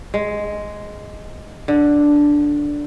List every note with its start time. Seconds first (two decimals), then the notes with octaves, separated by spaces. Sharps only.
0.14 G#3
1.68 D3